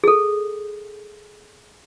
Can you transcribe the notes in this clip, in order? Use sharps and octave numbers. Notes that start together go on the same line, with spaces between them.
G#4 A4